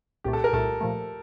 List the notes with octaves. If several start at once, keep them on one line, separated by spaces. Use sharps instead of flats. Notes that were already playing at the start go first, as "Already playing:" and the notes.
C2 A#2 A3 G4
A4
A#4
C2 A#2 A3 A4
A#2 F3 A3